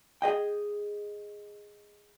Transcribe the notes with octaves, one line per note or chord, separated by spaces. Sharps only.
G#4 D#5 G5